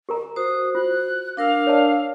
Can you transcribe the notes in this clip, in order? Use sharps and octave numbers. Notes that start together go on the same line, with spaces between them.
G4 A#4 A#5
F#4 C5 D#6
F4 F#6
D4 A#4 F5 E6
C#5 D5 A5